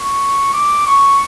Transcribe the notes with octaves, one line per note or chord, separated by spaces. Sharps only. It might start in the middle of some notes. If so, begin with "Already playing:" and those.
Already playing: C#6
D6
C#6